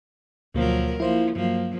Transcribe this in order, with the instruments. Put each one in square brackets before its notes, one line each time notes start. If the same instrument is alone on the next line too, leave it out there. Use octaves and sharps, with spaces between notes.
[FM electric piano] D2 B2 A#3 [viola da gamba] F3 F#3 A#4
[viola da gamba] F3 A#3 [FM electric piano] E4 C5
[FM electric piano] G2 F#3 [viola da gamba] F3 A#3